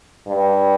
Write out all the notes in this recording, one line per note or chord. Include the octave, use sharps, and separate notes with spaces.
G2